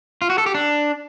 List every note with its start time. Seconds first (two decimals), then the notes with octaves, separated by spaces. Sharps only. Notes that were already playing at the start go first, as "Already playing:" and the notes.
0.22 F4
0.30 F#4
0.38 A4
0.46 G4
0.55 D4